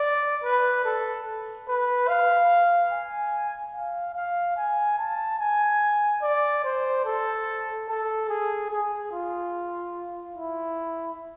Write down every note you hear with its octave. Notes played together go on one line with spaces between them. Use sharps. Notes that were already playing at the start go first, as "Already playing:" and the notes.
Already playing: D5
B4
A4
B4
F5
G#5
F5
F5
G#5
A5
G#5
D5
C5
A4
A4
G#4
G#4
F4
E4